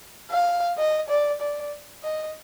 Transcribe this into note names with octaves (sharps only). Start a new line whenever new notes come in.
F5
D#5
D5
D5
D#5